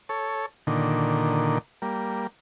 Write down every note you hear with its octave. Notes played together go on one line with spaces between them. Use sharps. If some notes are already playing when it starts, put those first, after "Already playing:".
A4 C#5
A#2 D3 D#3
G3 A#3